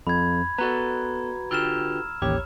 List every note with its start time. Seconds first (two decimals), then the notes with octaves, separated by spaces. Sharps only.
0.07 F2 B5 G#6
0.58 B3 F#4 A4 B4 D5 A#5
1.51 D3 F4 G4 E6 F6 E7
2.22 A1 D#2 G4 C#5